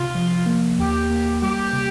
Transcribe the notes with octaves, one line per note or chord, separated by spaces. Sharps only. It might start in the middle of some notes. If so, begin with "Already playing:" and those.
Already playing: C3 F4
F3
A#3
D#2 G4
A#3
G3 G4
C3